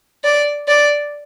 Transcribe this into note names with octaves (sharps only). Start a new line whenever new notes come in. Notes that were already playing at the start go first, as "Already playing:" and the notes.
D5
D5